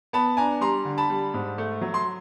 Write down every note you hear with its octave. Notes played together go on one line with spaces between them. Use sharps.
B3 A5 B5
D4 G#5 A#5
G3 A#5 C6
D3
A5 B5
G3
G#2
A3
F#3
C6